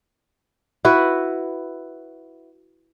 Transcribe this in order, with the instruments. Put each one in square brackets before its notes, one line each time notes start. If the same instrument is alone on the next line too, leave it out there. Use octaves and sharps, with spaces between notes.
[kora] E4 F#4 B4